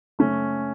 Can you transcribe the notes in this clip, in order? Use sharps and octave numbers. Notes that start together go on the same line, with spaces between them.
F#1 A3 C#4